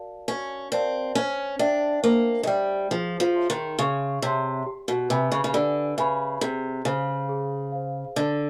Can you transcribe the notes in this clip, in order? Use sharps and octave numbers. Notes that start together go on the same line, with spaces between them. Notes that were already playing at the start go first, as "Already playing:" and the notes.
Already playing: F#4 A#4 D5 F5 A5
C#4 F#4
C4 A#4 D5 F5 A5
C#4 C5
D4 E5 G5
A#3 C5
G#3
G3 E5 G5
F3 G#4
F3
C#5 E5 A5 C6
D#3
C#3 G#4
C3 C#5 E5 A5 C6
G4
B2
C3 B4 E5 G#5 B5
C#3
C#3
D3 G4
C#3 B4 E5 G#5 B5
C3 G#4
C#3 C5 F5
G#4
C5 F5
D3 A4